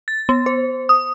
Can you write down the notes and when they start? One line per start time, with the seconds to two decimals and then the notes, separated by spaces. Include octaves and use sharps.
0.08 A6
0.29 B3
0.46 C5
0.89 D#6